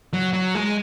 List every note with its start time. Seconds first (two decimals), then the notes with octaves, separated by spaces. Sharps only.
0.13 F#3
0.33 F#3
0.55 G#3